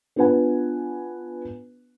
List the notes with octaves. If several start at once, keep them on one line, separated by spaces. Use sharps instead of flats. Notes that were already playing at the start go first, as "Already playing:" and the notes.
B3 D4 F4 B4 F#5 G#5